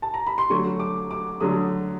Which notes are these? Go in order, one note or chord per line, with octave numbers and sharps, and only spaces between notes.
A5
A#5
B5
C6
D3 F#3 A3 C#6
D6
D6
D3 F#3 A3 D#6